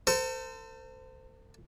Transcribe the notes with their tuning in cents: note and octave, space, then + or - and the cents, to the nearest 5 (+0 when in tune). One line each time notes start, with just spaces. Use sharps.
A4 +40 C5 -25